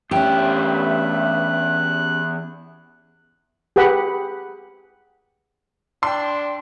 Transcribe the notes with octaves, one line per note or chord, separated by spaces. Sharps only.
E2 G2 A3 C#4 G4 E5 G5 F#6
G4 G#4 B4 F#5 B5
D4 G5 C6